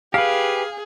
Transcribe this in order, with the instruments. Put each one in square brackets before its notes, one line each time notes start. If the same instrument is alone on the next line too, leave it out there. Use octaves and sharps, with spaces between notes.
[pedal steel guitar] G4 B4 [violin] G#4 [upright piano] F5